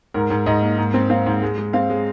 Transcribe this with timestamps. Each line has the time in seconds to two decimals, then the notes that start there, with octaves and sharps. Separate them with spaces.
0.14 G#2 A#4
0.30 G#2
0.46 G#2 D#5
0.62 A#3
0.78 G#2
0.94 C4
1.10 C4 F5
1.26 G#2
1.42 G#3
1.58 G#3
1.73 C4 F5
1.90 G#3